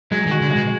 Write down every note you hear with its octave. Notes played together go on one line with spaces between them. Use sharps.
F#3 G#3
D#3
F#4
D3
G#3
B2